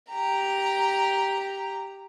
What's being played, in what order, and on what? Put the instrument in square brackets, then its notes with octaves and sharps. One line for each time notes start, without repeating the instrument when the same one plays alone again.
[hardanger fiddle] G4 A#5